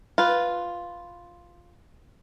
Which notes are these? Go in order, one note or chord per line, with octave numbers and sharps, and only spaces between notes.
F4 B4